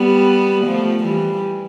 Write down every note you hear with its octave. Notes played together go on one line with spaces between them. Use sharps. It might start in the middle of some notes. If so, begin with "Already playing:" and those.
Already playing: G3 B3
F3 A3
E3 G3